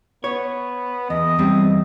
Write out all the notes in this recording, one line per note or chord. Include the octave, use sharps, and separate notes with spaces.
B3 C#5
E2 D#5
E2 G3 C4